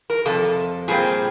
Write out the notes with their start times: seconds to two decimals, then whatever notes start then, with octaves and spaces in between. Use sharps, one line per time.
0.10 A#4
0.25 F2 C3 A4
0.88 A#2 G3 C4 G#4